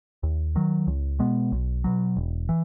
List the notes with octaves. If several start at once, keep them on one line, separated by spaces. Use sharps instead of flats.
D#2
D#3 F#3
C#2
B2 G#3 B3
B1
B2 F#3
E1
E3